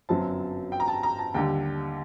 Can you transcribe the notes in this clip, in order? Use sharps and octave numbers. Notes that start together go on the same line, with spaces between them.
G1 F#2 F#3 C4 A5
G5
A#5
A5
A#5
A5
D#2 D3 G3 G5